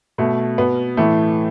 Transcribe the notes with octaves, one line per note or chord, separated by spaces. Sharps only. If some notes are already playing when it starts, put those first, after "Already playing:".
B2 A3
B2 B3
A2 E3 A3